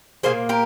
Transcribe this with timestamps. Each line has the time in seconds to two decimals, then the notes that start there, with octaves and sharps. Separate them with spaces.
0.23 F3 A#3 G#4 C5
0.28 A#2
0.49 G4 A#4